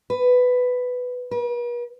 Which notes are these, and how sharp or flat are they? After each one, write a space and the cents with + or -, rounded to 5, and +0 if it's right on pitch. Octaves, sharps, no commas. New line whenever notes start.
B4 +10
B4 -45